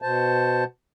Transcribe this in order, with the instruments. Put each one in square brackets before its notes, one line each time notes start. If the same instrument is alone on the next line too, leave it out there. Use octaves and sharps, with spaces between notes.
[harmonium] B2 C5 A5